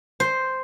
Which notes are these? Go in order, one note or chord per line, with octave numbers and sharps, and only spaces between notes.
C5